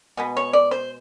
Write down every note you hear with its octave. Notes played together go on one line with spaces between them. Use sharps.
B2 G#3 B3
C#5
D5
C5